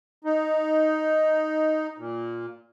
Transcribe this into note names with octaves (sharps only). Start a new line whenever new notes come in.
D#4
A#2